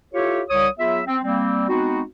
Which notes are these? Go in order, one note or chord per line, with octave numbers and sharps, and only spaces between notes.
E4 F4 G4 A4 C#5
C2 C#5 D#6
F#3 B3 F4 G#4 E5
C4
G3 A#3 C4
G#3 B3 C4 D#4 F#4